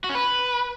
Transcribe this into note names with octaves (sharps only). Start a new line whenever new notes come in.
F#4
C#4
B4